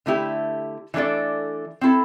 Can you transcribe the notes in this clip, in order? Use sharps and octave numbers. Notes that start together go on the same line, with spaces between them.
D3 A3 E4 G4
E3 A3 D4 A4 D5
C4 E4 A4